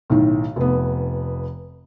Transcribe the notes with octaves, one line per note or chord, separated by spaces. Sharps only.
B1 A2 D#3
F1 B3